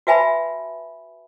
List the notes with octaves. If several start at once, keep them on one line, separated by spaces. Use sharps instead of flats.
F#4 B4 E5 G#5 A5 B5